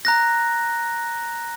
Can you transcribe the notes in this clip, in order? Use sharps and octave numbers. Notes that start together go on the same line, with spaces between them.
A#5 F#6 A#6